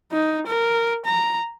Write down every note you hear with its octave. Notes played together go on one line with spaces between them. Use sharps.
D#4
A#4
A#5